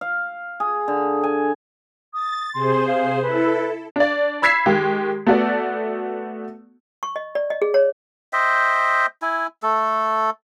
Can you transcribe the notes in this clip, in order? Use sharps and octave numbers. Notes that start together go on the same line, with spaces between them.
F5
G#4
D3
G#5
D#6 A6
C3 G#4 C5 C6
F5
E4 A4 B4
D4 D5
B5 E6 G#6 B6 C7 E7
D#3 G#3 G4
A3 B3 F#4 A4 D5
C#6
D#5
D5
D#5
G#4
C#5
C5 D#5 E5 G5
E4 G#5
A3 A4